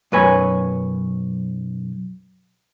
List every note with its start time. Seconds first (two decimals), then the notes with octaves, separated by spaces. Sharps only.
0.12 B1 F#2 B4 C#5 G#5